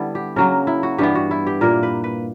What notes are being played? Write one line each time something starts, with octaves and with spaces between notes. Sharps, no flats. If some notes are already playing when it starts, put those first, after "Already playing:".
Already playing: D3 G3 B3 E4
G4
C#3 F#3 A#3 A#4
E4
F#4
G2 E3 B3 G4
F#4
E4
G4
A#2 A#3 A#4
B4
B4